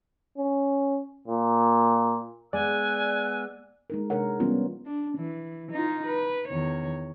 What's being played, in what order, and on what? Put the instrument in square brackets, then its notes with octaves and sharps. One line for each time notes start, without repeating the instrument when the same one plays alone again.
[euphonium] C#4
A#2
[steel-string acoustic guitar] G#3 B3 [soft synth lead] D5 [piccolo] G#5 [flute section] E6 F#6
[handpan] G#3 D#4 A#4
C3 G#3 D4 A#4 C#5 F#5
E3 G3 B3 C#4 F4
[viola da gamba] D4
E3
D#4 F4
B4
E2 D#3 C#5